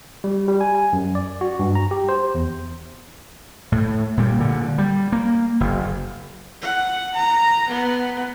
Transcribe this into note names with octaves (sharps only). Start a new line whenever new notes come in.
G3
G3
G#5
G#5
F#2
D5
F#4
G2
A#5
G4
C5
E2
A2
A#2 G3
A#2 D3
G3
A#3
F#1
F#5
A#5
B3